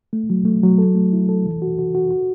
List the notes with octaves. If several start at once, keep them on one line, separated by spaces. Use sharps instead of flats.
A3
F#3
A3
F#3
A4
A3
E4
A4
E3
F#4
F#4
F#4
F#4